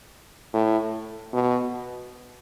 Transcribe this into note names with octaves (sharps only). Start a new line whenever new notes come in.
A2
B2